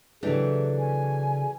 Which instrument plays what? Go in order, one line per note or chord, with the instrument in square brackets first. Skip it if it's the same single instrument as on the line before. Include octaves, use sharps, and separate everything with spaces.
[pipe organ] C#3 [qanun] E3 G4 [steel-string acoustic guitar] F#3 A3 D4
[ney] G#5